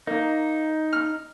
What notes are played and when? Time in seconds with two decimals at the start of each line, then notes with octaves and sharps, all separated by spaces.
0.07 A#3 D#4
0.93 F6